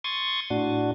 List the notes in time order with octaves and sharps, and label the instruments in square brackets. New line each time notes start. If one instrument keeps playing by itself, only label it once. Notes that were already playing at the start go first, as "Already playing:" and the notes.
[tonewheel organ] C6 C#6 D#6 G#6 A6
A2 D4 F#4